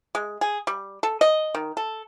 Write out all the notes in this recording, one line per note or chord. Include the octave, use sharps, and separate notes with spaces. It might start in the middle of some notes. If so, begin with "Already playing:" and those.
G#3
G#4
G3
A4
D#5
D#3
A4